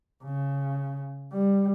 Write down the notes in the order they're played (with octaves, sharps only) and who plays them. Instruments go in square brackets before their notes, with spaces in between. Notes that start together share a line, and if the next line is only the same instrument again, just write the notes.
[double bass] C#3
G3